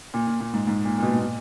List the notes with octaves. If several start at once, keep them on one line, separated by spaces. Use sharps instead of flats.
A#2
A#2
A#2
G#2
G#2
A#2
A#2
B2
G#2
A#2